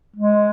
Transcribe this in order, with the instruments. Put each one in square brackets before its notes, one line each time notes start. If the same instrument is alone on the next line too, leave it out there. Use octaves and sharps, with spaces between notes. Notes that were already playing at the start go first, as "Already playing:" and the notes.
[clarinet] G#3